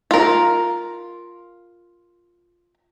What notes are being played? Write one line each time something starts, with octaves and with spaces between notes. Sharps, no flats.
F4 A#4